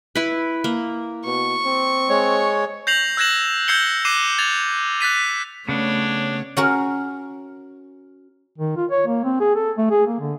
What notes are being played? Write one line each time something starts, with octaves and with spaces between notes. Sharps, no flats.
E4 B4
A#3
B2 C#6
C4
G#3 C#5
G6 A#6 C7 F7 F#7
E6 F#6 G#6 A#6 E7 F#7
E6 G6 G#6 C7 C#7 G7
D6 F#6 C7 D#7 E7
G#6 A6 F7
F#6 A6 B6 D#7
C#3 A3 B3 D4 C#5
C#4 F#4 A#4
D#3
F4
C#5
A#3
C4
G#4
A4
A3
G#4
A#3
D3